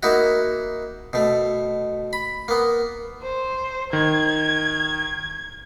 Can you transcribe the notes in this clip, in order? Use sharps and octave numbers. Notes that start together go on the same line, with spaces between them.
A#3 D#4 E4 F#4
B2 A3
B5
A#3 B3
C5
D#3 G#6